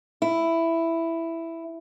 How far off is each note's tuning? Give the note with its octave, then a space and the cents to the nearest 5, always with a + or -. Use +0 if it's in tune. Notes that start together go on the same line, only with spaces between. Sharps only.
E4 +5